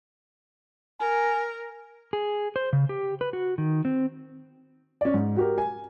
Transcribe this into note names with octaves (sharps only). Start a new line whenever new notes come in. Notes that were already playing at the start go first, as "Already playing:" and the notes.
A#4 G#5
G#4
C5
C#3
G4
B4
F#4
D#3
C4
C#4 D5
G#2
F#4 G4 A#4
G#5